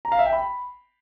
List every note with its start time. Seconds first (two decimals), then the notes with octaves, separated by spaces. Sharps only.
0.05 A#5
0.12 F5
0.19 E5
0.26 G5
0.33 B5